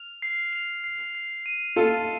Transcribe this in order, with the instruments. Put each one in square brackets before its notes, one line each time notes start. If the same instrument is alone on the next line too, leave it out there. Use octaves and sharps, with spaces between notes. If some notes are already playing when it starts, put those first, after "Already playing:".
Already playing: [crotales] F6 F7
C7
F7
C7
C7
D#7
[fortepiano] F4 A4 [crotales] C7